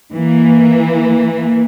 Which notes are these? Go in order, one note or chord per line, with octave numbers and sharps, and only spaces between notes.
E3 A#3